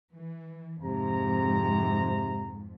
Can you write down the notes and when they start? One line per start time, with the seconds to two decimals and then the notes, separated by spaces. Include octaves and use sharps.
0.14 E3
0.82 F2 G#2 C3 A#5